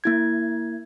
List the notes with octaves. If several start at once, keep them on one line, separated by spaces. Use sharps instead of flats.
A#3 E4 G#6